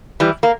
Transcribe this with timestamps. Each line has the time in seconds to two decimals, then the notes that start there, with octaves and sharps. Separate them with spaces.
0.20 E3 G3
0.43 A#3